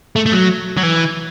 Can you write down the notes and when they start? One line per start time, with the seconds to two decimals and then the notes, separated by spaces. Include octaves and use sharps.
0.16 A3
0.26 A3
0.32 F#3
0.77 F#3
0.83 E3